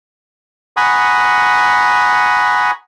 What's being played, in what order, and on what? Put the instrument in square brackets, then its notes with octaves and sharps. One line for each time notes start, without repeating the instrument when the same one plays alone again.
[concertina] F#5 G#5 A#5 B5 C#6 D#6